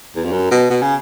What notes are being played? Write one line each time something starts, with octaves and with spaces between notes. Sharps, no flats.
E2
F2
F#2
B2
B2
C#3